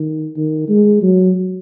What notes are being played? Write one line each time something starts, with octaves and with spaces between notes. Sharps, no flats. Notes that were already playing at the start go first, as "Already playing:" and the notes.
Already playing: D#3
D#3
G#3
F#3